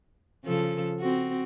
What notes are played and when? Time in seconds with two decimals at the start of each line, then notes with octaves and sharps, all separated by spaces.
0.45 C#3 F3 A4
1.00 C4 F#4